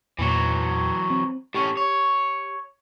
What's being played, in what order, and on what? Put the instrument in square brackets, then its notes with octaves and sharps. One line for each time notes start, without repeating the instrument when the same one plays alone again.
[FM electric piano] E2 A#2 C#7 [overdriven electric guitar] E3 F#3
[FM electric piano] C4
[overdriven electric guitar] A2 C#4 [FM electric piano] G4 C#6
[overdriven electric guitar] C#5